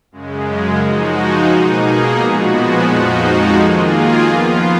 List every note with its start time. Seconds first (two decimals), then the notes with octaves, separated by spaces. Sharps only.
0.12 F#2 C#3 G#3
0.81 F3 G#3 D#4 F#4
1.51 B2 A#3 D#4 G#4
2.20 A#2 F3 G#3 B3 F#4
2.89 F2 F3 G#3 D#4 F#4
3.58 D#3 A#3 F4 G#4
4.28 F3 B3 F4